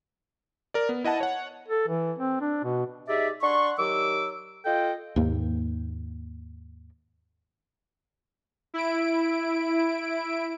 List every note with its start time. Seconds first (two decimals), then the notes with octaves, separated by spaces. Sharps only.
0.74 A#4 D5
0.89 B3
1.04 E4 D#5 F#5 A5
1.20 C#5 F#5
1.68 A4
1.88 E3
2.18 C4
2.41 D4
2.64 B2
3.09 D#4 G4 G#4 D5 E5
3.42 D4 F#5 C6 C#6
3.78 D#3 F#3 G4 D6 E6
4.65 F4 A4 D#5 G5
5.16 D#2 G#2 A#3
8.74 E4 D7